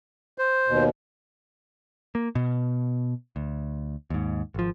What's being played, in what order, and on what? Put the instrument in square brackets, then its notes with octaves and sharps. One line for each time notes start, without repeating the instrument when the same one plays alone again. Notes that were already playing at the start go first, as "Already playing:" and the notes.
[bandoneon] C5
[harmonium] D#2 B2
[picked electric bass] A#3
B2
D2
D#2 G#2
G#1 F3